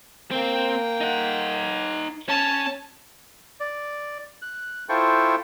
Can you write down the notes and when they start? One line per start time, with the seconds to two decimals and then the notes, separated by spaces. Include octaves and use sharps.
0.31 A#3 C4 G5
1.01 D#4 F#5
2.29 C#4 A5
3.60 D5
4.42 F#6
4.89 E4 F4 A4 C5 G5 C#6